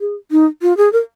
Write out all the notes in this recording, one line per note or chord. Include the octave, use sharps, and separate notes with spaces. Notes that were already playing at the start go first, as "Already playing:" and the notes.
G#4
D#4
F4
G#4
A#4